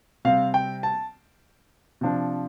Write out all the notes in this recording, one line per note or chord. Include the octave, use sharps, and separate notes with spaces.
C3 G3 C4 F5
G5
A5
C3 F3 D4